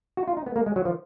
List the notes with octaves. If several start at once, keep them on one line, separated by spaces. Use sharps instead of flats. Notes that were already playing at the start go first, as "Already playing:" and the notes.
F#4
F4
D#4
B3
A#3
G#3
F#3
F3